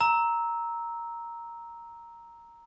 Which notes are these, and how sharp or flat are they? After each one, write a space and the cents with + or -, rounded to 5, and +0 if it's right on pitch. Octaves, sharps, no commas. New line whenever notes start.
A#5 +0 E6 -15